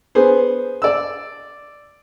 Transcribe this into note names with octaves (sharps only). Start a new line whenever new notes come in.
B3 G#4 C5
D5 E6